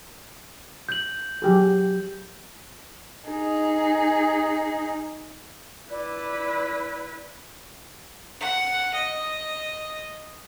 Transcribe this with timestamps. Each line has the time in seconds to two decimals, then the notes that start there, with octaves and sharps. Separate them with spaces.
0.89 G6 F#7
1.42 F#3 G4 G#4
3.30 D#4 G#4
5.91 E4 B4 D5
8.40 F#5
8.94 D#5